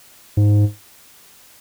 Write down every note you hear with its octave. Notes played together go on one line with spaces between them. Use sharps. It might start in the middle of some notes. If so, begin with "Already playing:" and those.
G#2